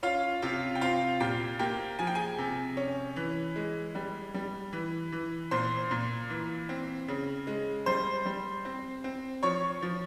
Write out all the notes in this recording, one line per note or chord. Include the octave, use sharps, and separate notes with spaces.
C#4 F4 F5
C3 F4 F5
G5
C4 F4 F5
A#2 G4 G5
A#3 G4 G5
F3 G#5
G5
G#4 G#5
C3
C#4
E3
G#3
G3
G3
E3
E3
A#2 C5 C6
A#2
E3
C4
C#3
G#3
G3 C5 C6
G3
C4
C4
F3 C#5 C#6
F3